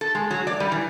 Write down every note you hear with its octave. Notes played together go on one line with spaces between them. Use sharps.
A4
G#3
F#3
D5
G3
E3